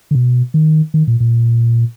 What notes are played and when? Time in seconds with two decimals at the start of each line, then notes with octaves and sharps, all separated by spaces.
0.11 D3
0.15 B2
0.54 D#3
0.94 D#3
1.08 A#2
1.20 A#2